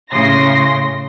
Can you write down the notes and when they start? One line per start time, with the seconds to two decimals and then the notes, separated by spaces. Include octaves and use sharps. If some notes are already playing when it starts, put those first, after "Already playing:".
0.10 A2 C#3 C6 A#6